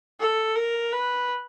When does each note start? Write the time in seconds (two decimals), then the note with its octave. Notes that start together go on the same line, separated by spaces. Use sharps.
0.20 A4
0.56 A#4
0.92 B4